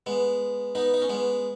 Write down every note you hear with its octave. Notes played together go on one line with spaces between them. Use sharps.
G#3 B3
B3 D#4
D#4
C#4
G#3 B3